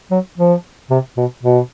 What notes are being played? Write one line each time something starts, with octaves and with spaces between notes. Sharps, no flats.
F#3
F3
C3
B2
B2